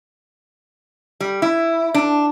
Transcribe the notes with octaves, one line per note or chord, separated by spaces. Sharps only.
G3
E4
D4